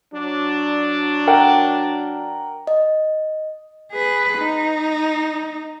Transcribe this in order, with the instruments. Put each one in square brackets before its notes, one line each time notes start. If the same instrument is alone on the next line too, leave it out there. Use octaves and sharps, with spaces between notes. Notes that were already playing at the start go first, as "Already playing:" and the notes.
[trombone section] F#3 D4
[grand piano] A#4 F#5 G5
[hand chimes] D#5
[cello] G#4 B4
D#4